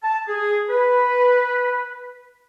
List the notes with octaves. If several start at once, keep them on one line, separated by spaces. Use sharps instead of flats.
A5
G#4
B4